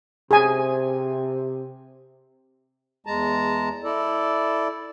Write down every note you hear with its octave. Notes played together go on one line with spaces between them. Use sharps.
C3 G#4 G#5
E2 G#3 A5 A#5
E4 A4 D5